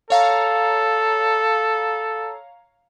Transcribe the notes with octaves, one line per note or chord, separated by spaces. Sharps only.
A4 C#5 F5 A#5